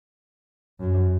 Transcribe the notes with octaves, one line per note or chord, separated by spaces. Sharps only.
F#2